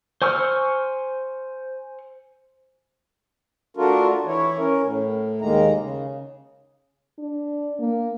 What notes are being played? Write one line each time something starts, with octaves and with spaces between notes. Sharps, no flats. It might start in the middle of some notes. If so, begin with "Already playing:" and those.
C5 G#5 C#6 E6 F6
A3 D4 F4 F#4 A#4
E3 E4 C#5
C#4 A#4
A2
D#2 D#3 G#3 A#3 A#5
C#3
D4
A#3